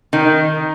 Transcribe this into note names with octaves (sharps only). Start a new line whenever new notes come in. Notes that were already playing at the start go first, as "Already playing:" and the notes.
D#3 D#4